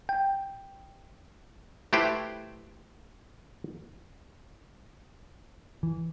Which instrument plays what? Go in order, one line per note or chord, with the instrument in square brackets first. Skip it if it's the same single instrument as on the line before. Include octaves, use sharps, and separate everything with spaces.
[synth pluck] G5
[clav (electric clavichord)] A3 E4 G4 B4 C5 G5
[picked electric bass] E3